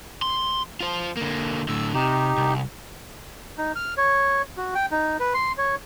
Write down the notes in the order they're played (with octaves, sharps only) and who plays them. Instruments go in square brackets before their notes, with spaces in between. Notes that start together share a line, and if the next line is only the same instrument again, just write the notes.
[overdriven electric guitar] C6
F4 C5
D3 A#3
[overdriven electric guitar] A2 D3 [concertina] E6
[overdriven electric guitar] C3 [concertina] D#4 G4
[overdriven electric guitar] C2
[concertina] D#4
F6
C#5
F#4
G5
D#4
B4
C6
C#5